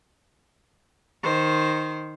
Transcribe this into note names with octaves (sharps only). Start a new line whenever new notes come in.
D#3 C5